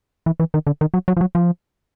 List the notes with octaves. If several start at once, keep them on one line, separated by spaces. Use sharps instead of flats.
E3
E3
D#3
D3
D#3
F#3
F#3
F3
F#3
F3